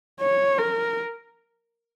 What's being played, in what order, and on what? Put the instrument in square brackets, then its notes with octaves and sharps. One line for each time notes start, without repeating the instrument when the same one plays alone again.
[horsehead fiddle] C#5
A#4